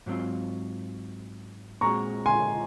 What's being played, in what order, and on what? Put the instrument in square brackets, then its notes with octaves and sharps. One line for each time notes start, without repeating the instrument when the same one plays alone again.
[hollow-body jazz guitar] G#2 F#3 C4 F4
[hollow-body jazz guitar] A#2 G#3 C4 F#4 [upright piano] A#5 C#6
[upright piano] G#5 C6